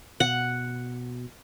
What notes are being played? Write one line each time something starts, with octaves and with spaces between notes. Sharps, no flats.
B2 F#5